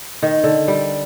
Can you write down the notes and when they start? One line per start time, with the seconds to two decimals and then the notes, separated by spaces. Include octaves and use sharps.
0.22 D#3
0.44 D3
0.68 G3